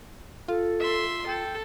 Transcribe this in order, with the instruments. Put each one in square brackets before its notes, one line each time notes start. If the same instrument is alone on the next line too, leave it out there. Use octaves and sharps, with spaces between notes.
[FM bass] F4 [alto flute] A4
[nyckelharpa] E5 C6
[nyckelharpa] A4 [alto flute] G5